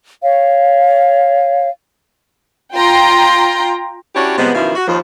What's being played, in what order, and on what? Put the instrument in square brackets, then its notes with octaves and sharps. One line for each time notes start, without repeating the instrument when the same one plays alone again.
[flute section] C#5 F5
[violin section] F4 G5 A#5 C6
[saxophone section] C#4 D4 E4 F#4 G4 C#5
C3 F3 G3 G#3 B3
F#2 B2 D#3 F3 E4 F5
F#4
D#2 F3